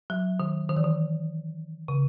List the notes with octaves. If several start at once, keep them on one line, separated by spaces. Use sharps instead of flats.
F#3
D#3
D#3
E3
D#3
C#3